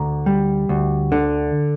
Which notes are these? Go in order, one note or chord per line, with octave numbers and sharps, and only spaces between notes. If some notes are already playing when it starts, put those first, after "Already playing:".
Already playing: D2 D3 A#5
G3
D2
D3